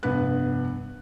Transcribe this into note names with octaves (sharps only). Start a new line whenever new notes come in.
F1 G2 B3 B4 F#6